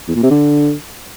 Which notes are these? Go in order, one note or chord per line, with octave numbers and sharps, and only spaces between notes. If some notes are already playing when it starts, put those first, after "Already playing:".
E2
A#2
C3
D3